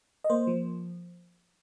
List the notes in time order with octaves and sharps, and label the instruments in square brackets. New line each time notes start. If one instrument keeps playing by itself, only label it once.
[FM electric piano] D#5
A#3 C5
F3